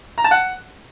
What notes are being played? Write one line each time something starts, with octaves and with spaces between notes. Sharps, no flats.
A#5
A5
F#5